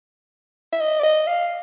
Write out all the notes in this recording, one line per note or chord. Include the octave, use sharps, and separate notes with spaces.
E5
D#5
D5
D#5
F5